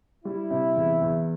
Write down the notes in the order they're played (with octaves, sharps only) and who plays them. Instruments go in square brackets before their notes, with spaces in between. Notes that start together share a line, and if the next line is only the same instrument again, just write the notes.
[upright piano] G3 [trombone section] E4
[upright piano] C3
E2
E2